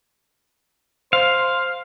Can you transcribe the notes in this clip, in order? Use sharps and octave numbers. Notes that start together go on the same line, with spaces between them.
C5 F5